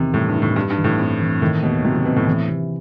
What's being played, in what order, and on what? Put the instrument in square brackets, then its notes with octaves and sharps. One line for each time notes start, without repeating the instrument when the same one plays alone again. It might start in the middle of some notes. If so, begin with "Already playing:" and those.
Already playing: [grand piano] E2 D#3 [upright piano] C3
[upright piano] A2 [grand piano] G3
[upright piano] G2
[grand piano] D#4
[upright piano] A2
[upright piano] G2 [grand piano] G3
[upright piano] G2
[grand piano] E3
[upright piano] A2
[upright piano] G2 [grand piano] C4
[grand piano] E3
[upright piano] A2 [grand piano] D#3
[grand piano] D#2 [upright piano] B2
[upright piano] C3 [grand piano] F#3
[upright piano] C3
[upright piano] B2 [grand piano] C4
[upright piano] A2
[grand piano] E3
C3